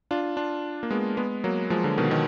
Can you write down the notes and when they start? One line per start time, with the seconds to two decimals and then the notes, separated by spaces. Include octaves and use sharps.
0.11 D4 F4
0.37 D4 F4
0.83 A#3
0.90 G#3 B3
1.17 G#3 B3
1.44 F#3 A#3
1.70 F3 G#3
1.84 D3 F3
1.98 B2 D#3
2.11 B2 D#3